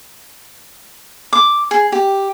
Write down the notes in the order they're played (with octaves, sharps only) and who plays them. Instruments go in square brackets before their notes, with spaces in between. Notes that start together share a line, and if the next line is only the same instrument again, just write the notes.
[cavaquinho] D6
G#4
G4